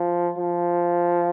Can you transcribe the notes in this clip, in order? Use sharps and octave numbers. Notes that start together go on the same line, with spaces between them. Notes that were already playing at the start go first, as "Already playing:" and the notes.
Already playing: F3
F3